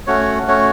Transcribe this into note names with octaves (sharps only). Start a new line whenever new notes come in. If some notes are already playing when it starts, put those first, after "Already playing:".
A3 C#4 F#4 C#5
A3 C#4 F#4 C#5